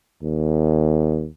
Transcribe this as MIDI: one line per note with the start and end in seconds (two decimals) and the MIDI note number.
0.23 1.28 39